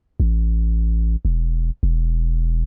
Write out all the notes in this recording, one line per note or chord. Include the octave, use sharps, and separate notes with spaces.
A1
E1
E1